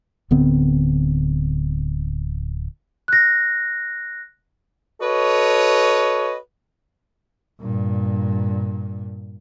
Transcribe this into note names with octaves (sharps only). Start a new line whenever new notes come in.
D1 D3 B3 C4
F#6 A#6
F#4 A4 B4 C#5 D#5
G2 A#2